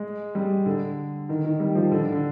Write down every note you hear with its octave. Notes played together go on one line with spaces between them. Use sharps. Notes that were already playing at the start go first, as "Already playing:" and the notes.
Already playing: G#3
G3
D3
D#3
D#3
G3
F3
D3
D3
D3